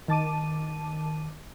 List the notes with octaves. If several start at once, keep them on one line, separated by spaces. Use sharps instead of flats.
D#3 A5 D6 D#7